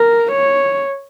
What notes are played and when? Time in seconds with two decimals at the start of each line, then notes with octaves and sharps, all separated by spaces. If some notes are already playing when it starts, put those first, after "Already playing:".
Already playing: A#4
0.32 C#5